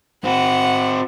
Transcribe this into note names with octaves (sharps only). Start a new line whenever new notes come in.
C4 F#4 F#5